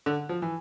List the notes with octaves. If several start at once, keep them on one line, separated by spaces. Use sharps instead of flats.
D3
F3
E3